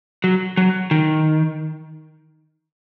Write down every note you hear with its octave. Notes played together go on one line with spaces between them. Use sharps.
F#3
F#3
D#3